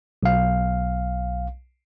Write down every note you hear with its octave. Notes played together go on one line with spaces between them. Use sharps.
B1 F5